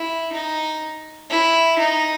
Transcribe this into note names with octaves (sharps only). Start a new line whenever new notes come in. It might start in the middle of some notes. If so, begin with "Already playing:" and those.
Already playing: E4
D#4
E4
D#4